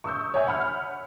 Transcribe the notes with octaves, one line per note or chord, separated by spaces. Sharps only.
C#6 D#6 E6 G6
C#5 E5 G#5 G6
F#5 B5 F6